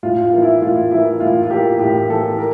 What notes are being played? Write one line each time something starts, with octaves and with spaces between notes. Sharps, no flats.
A2 F4
F4
E3 A#3
E4
A2 F4
E3 A#3 E4
A2 F4
F4
E3 A#3 G4
A2 G4
E3 A#3 A4
A#4